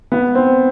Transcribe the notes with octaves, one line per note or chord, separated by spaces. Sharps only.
B3
C4